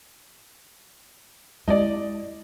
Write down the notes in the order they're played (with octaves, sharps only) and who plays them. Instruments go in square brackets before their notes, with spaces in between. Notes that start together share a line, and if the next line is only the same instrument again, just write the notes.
[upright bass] G#3 E4 [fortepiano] D5 D#5